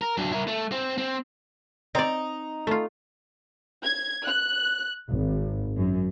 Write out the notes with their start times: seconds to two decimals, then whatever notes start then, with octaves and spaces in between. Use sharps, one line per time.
0.01 A#4
0.17 F#3 D4
0.32 E4 A#4
0.48 A3
0.72 C4
0.98 C4
1.95 C4 D#4 D5
2.67 A3 F4
3.83 G#6
4.25 F#6
5.10 G#1
5.77 F#2